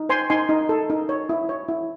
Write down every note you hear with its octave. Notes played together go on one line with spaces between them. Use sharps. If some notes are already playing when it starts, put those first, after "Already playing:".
Already playing: D#4
C5 G#5 C6
D#4 G#5 C6
D#4
A4
D#4
C#5
E4
C#5
E4